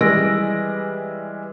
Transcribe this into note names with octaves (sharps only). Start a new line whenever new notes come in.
E3 G3 G#3 E6 A#6 D7